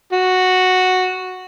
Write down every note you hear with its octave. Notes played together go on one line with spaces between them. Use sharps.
F#4